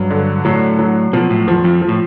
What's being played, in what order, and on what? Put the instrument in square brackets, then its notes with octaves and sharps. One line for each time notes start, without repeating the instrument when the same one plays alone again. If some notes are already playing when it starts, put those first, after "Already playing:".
Already playing: [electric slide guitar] G2 [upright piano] F#3
[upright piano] D3
[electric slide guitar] A2 [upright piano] F#3
[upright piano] F#3
[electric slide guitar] B2 [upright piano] F3
[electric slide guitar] A2
[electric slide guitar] E2 [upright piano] F3
[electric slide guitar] F2
[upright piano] F3
[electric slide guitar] A2